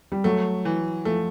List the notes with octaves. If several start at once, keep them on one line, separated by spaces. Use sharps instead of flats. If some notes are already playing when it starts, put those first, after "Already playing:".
G3
F#3 A3
E3
F3 A3